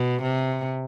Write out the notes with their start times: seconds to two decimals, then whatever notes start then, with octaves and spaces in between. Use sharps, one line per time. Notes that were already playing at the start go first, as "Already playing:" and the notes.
Already playing: B2
0.23 C3